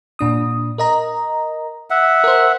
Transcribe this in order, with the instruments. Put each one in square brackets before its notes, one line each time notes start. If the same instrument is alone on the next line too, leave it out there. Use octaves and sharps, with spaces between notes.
[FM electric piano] A#2 D4 D#6
A#4 D#5 A#5
[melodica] E5 F#5
[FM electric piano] A#4 C5